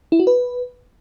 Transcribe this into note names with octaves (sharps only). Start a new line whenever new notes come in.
E4
F#4
B4